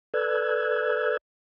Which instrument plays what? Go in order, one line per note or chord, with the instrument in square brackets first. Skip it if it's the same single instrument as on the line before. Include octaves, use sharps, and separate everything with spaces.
[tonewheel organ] A4 B4 D5 E6 F#6 G#6